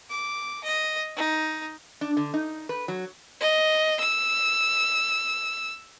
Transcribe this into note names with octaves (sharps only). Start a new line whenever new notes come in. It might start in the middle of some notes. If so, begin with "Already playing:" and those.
D6
D#5
D#4
D4
D3
D#4
B4
F#3
D#5
E6